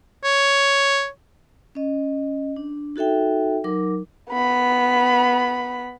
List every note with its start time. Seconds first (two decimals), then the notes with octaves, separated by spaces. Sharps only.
0.24 C#5
1.75 C#4 D#5
2.56 D4
2.96 D#4 F#4 A4 E5 G5
3.64 F#3 D#4 A#4 D6
4.31 B3 B5